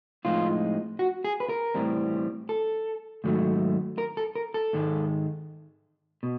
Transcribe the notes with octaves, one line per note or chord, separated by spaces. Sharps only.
A2 F3 G#3 C4 D#4 F4
F#4
G#4
B4
A#4
A2 E3 G3 C4
A4
G#2 D#3 F#3 A3
A#4
A4
A#4
A4
G#2 D#3 G#3
B2